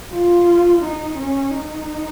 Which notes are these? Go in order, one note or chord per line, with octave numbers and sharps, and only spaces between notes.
F4
D#4
C#4
D#4